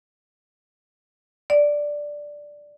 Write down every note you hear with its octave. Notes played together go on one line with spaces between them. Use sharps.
D5